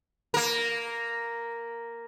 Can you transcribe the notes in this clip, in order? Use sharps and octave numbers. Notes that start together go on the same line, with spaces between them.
A#3 A#4